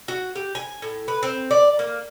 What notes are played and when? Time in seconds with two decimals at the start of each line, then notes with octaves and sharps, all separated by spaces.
0.08 F#4
0.36 G4
0.55 G#5
0.82 A2
1.08 B4
1.23 C4
1.51 D5
1.79 A#3